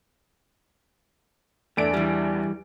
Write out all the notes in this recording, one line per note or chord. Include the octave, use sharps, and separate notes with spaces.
E2 A3 D4 D7
E3 G3